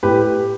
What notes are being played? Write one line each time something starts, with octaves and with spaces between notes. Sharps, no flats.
A2 G4 B4